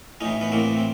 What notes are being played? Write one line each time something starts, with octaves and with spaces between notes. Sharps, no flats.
A2 E3 C#4 D#4
B3 C#4
A2 E3 A#3 C4
C4